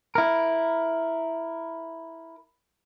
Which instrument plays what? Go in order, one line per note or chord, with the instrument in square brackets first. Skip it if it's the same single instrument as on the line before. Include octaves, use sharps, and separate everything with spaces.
[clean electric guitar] E4 A#4